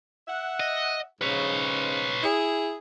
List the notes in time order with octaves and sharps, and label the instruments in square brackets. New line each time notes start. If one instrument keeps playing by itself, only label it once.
[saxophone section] E5 F#5
[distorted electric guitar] D#5
[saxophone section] G#2 C#3 [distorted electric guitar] B4 C#5
[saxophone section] E4 G#4